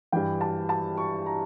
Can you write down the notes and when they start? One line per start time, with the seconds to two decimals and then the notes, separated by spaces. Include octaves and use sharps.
0.12 G2 E3 G5
0.41 A5
0.69 A5
0.97 C#6
1.26 A#5